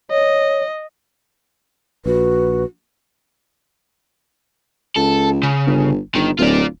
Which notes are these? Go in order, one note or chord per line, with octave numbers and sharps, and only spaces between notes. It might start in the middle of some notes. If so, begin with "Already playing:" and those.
C#5 D#5
A#1 F#4 B4
C#2 A4
C#3
G1
G1 D#3
D1 F4 D5